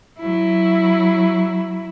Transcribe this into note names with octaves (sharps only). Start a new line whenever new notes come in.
F#3 E4